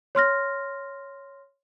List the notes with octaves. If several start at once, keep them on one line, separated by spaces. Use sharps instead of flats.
C#5 C6 F6 A#6